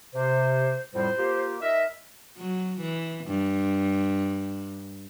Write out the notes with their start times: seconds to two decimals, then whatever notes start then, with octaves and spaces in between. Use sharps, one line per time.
0.14 C3 C5
0.94 F2 A2 G3 C5
1.17 A#3 F4 G4
1.61 D#4 A#4 D#5 E5
2.38 F#3
2.81 E3
3.27 G2